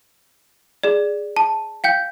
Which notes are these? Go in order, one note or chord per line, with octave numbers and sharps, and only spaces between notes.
G#4 D5
A5
F5 G5 G6